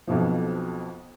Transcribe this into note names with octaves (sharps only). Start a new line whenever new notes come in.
B1 F2 B2 F3